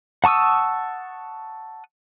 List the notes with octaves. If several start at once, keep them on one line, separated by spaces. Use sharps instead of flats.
F#5 A5 C#6 D#6 E6